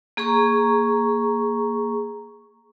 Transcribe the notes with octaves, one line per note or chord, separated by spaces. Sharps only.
A#3 G#4 A#5 C#6